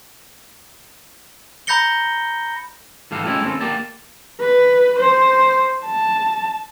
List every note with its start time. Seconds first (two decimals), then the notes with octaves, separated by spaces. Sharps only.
1.67 A#5 B5 G6 A#6 C#7 G7
3.11 G#2 D3 E3 G3 A4 F5
3.24 G#3 C#4 E4 F4 G4 A4
3.44 D#2 C4 C#4 A4
3.61 D3 A#3 G4 A5
4.40 B4
4.99 C5
5.85 A5